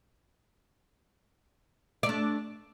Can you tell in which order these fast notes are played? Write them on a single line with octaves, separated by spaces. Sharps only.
D5 A3 D4